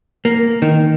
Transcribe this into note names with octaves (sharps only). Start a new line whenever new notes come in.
A#3
D#3